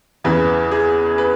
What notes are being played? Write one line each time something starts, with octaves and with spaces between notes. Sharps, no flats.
E2 C#3 E3 B4
G#4
B4